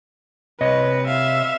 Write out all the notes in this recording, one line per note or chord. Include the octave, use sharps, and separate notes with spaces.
C3 B4 C#5 D#5
E5 F5